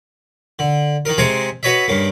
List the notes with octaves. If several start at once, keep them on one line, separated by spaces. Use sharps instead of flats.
D3
D#3 D#4 A#4
C3 G#3 C4 G#5 A#5 C#6
F#4 B4 C#5 D#5 E5
G2 C#3 A#3